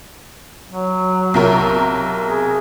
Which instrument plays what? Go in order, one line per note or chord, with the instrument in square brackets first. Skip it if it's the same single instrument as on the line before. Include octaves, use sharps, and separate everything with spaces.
[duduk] F#3
[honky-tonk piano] B1 C3 A#4
[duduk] G#4